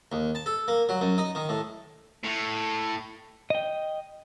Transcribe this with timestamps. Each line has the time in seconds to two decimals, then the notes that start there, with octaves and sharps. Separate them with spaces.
0.12 D#2
0.35 A5
0.46 A4
0.68 A#3
0.89 F#3
1.01 F#2
1.18 D#4
1.35 D#3
1.49 A2
2.23 A2
3.50 D#5 G5